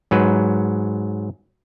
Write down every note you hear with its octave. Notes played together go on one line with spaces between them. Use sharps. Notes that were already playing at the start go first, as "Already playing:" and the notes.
G#2 F#3 B4